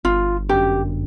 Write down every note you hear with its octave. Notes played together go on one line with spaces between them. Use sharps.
G1 F4
F#2 D3 G4